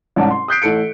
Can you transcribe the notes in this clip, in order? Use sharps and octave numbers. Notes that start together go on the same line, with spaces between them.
C2 G#2 C#4 D5 F#5 A5
C6
D#6 F#6 G6 B6 C7 D7
A1 A2 A4 C#7 D7